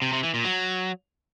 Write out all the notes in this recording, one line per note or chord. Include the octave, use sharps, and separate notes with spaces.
C3
C3
E3
A#2
F#3